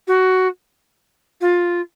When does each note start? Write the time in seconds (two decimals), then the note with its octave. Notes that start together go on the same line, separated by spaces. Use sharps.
0.07 F#4
1.41 F4